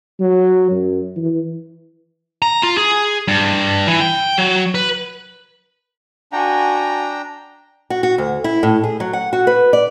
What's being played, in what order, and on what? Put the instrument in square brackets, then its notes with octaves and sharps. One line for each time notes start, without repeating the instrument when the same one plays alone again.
[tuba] F#3
F#2
E3
[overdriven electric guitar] A#5
F4
G#4
G2
E3
G5
F#3
B4
[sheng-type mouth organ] D4 G5 A#5 [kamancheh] F#4 G#5
[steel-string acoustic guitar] F#4
F#4
D2
E4
A2
G#4
F#3
F#5
F#4
B4
D5